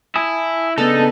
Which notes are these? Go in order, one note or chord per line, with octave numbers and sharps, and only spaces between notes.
E4 G#5 A5 D#6
C#3 B3 D4 D#4 A4